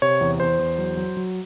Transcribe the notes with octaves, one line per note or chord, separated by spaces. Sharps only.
C3 C#5
E2
E2 C5
E2
F#3
F#3
F#3